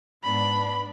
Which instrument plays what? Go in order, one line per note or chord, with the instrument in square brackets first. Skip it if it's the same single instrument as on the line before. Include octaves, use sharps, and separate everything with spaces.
[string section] G#2 B3 D4 [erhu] B5